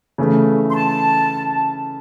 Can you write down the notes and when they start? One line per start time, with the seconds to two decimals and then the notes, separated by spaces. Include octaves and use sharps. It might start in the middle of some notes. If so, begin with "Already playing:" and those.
0.18 C#3 E3 A3
0.71 C6
0.75 A5